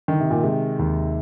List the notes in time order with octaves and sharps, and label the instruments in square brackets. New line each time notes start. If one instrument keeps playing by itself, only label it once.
[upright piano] D3 [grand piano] D#3
[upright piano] C3
A#2
[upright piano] C3 [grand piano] G#3
[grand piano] D#2